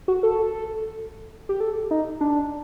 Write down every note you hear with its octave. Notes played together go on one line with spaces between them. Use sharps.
F#4
A4
G4
A4
D#4
D4